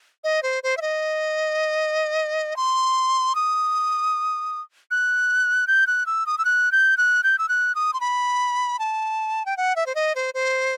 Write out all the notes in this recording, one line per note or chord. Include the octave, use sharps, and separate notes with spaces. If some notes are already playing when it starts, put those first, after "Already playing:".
D#5
C5
C5
E5
D#5
C6
D#6
F#6
G6
F#6
E6
D#6
E6
F#6
G6
F#6
G6
E6
F#6
D#6
C6
B5
A5
G5
F#5
E5
C5
D#5
C5
C5